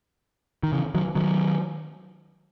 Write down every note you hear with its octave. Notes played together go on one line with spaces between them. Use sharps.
D#3
C#3 E3
D#3 F#3
D#3 F#3